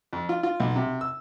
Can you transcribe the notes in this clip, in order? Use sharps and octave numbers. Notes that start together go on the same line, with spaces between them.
F2
F4
F4
B1
C3
E6